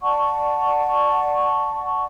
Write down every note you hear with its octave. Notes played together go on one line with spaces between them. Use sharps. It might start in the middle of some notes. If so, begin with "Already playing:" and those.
D5 F#5 A5 C#6